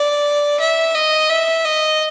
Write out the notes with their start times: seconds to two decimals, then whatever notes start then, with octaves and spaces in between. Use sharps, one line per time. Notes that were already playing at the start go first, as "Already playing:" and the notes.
Already playing: D5
0.60 E5
0.95 D#5
1.30 E5
1.65 D#5